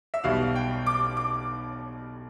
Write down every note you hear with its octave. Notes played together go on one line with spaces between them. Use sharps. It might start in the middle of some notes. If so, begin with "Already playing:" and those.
E5
B1 B2 G3 F5
G5
D6
D6